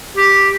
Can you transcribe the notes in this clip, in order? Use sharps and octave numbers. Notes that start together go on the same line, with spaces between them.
G4